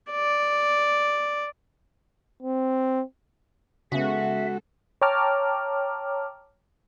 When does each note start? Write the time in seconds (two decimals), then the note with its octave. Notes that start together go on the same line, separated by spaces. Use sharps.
0.11 D5
2.43 C4
3.92 C#3 G#3 B3 F#4 A4 E5
5.02 C#5 G5 A5 A#5 D6 F6